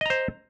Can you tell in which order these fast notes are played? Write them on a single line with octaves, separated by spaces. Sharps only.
D#5 A#5 C5